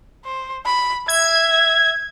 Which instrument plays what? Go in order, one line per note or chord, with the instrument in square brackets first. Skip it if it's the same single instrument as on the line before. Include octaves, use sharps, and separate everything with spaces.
[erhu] C5
B5
[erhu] E5 [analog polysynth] G#6